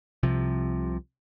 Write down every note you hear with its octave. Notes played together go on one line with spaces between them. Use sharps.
C2 C3 F3